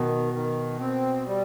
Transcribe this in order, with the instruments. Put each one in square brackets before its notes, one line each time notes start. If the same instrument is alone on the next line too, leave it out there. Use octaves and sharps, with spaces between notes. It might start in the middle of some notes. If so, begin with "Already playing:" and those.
Already playing: [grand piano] B2 [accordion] D#3
[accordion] D#3
C4
G3